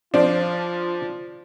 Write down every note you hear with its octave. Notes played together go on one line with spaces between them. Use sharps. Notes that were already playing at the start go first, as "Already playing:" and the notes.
F3 D4 F4 C5 D5